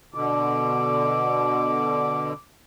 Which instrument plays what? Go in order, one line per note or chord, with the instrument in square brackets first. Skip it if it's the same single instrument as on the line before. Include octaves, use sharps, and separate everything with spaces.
[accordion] B2 D3 [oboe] D6